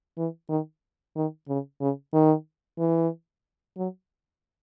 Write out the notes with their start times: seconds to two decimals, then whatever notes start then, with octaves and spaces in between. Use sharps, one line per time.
0.17 E3
0.49 D#3
1.15 D#3
1.48 C#3
1.80 C#3
2.13 D#3
2.78 E3
3.77 F#3